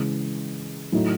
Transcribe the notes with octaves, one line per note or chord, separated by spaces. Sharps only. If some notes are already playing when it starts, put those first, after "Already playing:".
Already playing: C#3 E3 G#3
A2 F#3 A3 D#4